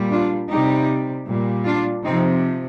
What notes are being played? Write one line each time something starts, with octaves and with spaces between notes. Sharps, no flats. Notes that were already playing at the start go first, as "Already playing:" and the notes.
Already playing: A#2 G3
D4 F4
C3 G3 D#4 G4
A#2 G3
D4 F4
C3 F3 C4 D#4